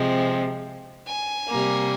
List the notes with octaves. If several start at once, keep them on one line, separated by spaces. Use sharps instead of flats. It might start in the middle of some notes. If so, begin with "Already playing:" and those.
Already playing: C3 F3 G#3 C4
G#5
C3 G3 A#3